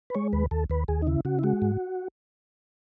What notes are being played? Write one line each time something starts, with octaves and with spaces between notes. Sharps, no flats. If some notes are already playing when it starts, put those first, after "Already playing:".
B4
G#3 C#5
D#2 B4
D#2 A4
D#2 B4
D#2 G#4
D#4
C#3 E4
C#3 F#4
E4
G#3 F#4
G#2